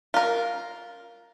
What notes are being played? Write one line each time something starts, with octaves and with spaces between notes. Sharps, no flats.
F4 A#4